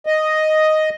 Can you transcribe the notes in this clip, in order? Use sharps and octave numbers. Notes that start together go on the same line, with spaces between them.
D#5